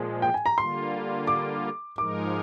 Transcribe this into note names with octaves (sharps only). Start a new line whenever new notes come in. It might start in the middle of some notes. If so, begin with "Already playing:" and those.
Already playing: A#2 F3 G#3
G5
G#5
A#5
D3 G3 A#3 F4 C6
D6
G#2 F3 G#3 D#4 A#4 D6